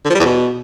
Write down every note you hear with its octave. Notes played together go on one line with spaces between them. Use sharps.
D3
F3
G3
E2
B2